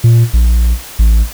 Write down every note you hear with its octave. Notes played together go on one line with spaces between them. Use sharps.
A#2
A#1
A1